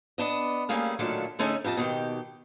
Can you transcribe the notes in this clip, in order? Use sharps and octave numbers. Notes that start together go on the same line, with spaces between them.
B3 D4 D#5
G3 A3 A#3 C#4 G#4 F5
A#2 D3 D#3 F#3 A3 D4
D3 A3 C#4 D#4 G#4
F2 G4 D#5 A5
B2 D#3 G4 G5